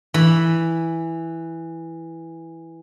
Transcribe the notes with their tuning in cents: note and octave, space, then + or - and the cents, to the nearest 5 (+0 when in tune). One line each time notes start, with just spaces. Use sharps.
E3 +0 B5 -5